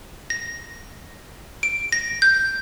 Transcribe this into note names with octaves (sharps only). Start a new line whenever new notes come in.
A#6
D7
A#6
G6